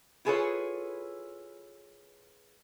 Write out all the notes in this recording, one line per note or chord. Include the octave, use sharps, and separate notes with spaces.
E4 F4 G#4 A4 B4 C#5